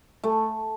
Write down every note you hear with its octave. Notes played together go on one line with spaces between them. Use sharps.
A3